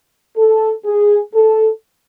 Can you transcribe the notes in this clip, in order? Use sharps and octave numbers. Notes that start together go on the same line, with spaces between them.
A4
G#4
A4